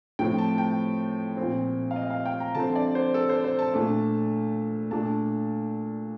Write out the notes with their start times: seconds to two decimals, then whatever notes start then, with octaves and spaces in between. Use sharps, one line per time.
0.19 A2 F3 C4 G5
0.38 A5
0.58 G5
1.37 A#2 F3 C4
1.91 F5
1.96 D#5
2.10 F5
2.26 G5
2.40 A#5
2.55 D3 F3 C4 A5
2.75 D5
2.95 C5
3.14 A4
3.29 C5
3.44 C5
3.59 A5
3.74 A#2 A3 D4
4.91 A#2 A3 D4 A5